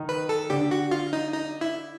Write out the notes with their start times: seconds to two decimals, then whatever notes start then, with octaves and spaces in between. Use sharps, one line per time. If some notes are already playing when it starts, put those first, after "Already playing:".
Already playing: D#3 D#4
0.09 B4
0.29 A4
0.50 D3 D4 G4
0.71 F#4
0.91 F4
1.13 D#4
1.33 D#4
1.61 E4